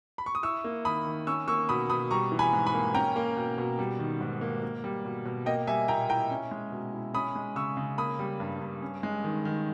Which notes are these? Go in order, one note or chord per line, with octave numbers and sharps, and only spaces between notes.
B5
C#6
D#6
E4 C#6 E6
A#3
D#3 B5 D#6
D#3
C#4 C#6 E6
A#3 C#6 E6
B2 B5 D#6
B2 B5 D#6
G3 A#5 C#6
E3
G#5 B5
G#2
G#5 B5
A#3
C#4 G5 A#5
A#3
B2
B2
G3
D#3
G#2
A#3
A#3
G3
B2
B2
A#3 D#5 G5
G3 E5 G#5
A#2 G5 A#5
E4 G5 A#5
C#4
G#3
B2
E4
C#4 B5 D#6
G#3
C#3 C#6 E6
C#3
A#3 B5 D#6
G3
G2
G2
C#4
G#3
D#3
D#3